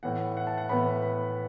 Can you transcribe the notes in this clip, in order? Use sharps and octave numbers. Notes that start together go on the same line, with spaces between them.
A2 E3 B3 F#5
F#5
A5
F#5
A2 E3 B3 B5
B5